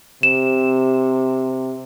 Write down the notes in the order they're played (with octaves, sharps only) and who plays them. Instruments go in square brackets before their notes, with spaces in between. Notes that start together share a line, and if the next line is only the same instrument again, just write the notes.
[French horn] C3 [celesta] E7